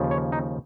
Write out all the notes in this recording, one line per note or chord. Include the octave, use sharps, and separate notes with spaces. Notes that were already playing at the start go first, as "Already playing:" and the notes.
Already playing: D#2 C#3 F3
C#5
D#4